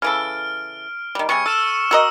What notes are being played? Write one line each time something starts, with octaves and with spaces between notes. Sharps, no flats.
C#3 E3 A4 F6 D7
D#3 G3
C3 G3 G#4 C#6 C#7
A4 E6 F6 E7
F#4 A#4 D#5 E6